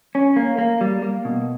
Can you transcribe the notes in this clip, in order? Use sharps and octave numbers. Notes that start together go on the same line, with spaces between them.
C#4
A#3
A#3
G3
A#3
B2